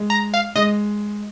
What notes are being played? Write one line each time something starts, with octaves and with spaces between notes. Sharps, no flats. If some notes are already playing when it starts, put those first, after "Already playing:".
Already playing: G#3
A#5
F5
G#3 D#5